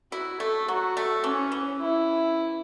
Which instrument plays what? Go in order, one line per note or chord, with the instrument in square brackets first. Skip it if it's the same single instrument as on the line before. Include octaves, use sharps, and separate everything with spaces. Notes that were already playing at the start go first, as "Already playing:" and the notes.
[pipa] E4 [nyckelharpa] F#4
[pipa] A3 [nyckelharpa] A4
[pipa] F#3 [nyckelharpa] F#4
[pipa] A3
[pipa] E3 [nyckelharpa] C#4
[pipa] E3
[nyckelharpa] E4